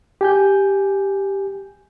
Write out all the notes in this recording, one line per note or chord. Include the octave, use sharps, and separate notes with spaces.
G4 G#5 G6